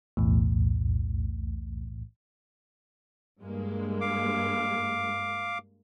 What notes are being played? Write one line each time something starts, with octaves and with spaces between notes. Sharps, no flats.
B1 E2 A2
G2 G#3 A#3
F5 D6